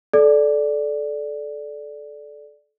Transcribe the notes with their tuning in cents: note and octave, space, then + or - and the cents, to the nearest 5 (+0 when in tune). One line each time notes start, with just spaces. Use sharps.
A4 -20 D5 +0